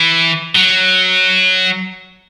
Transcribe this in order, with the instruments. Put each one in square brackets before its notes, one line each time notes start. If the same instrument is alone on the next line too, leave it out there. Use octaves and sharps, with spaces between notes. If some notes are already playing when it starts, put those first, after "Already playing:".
Already playing: [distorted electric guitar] E3
F#3